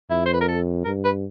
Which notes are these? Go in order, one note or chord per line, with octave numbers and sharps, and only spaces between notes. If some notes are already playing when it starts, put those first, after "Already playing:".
F2 E4
C5
B4
A#4
A4
G2 A#4
B4